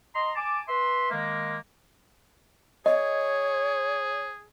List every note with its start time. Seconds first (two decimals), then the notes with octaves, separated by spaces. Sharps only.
0.14 D#5 A#5 C6
0.36 G#5 A5 D6
0.68 B4 E5 C6
1.11 D#3 G#3 A#3
2.86 G#4 C#5 D#5